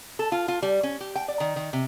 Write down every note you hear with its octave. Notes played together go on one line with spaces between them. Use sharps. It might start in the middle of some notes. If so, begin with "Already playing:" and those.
A4
F4
F4
G3
C#4
G4
G5
D5
D#3
D#3
C3